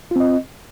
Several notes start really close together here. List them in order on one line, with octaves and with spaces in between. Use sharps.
F4 C4 D#5